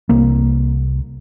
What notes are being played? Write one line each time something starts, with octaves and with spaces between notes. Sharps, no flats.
C2 A#3